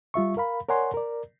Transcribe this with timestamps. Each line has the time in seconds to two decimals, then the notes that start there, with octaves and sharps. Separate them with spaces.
0.14 G3 F4 E5 C#6
0.37 A#4 F5 B5
0.69 A#4 C#5 D5 F#5 G#5 C6
0.94 A#4 D5